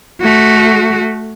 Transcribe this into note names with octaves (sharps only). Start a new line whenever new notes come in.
A3 F#4